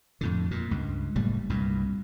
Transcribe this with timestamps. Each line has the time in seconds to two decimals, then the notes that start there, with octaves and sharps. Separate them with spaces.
0.21 F2 A2 D3
0.51 F2 A#2
0.71 C#2 G2
1.16 F#1 A2 G3
1.50 C2 G2 A#2